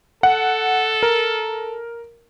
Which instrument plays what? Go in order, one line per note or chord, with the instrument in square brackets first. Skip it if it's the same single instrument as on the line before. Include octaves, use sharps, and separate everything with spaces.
[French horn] A4 [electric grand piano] F#5
[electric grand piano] A#4